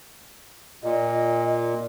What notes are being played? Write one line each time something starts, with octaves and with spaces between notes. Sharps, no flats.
A#2 D#5